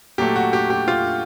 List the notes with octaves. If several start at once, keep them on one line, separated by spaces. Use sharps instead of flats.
A#2 F#3 A3 G4
F#4
G4
G4
F4